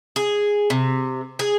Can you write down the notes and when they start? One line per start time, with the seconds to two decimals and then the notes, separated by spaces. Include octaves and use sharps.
0.16 G#4
0.70 C3
1.39 G#4